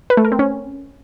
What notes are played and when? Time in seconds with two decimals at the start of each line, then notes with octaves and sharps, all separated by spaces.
0.10 B4
0.17 A3
0.25 A#4
0.32 C4
0.39 C#4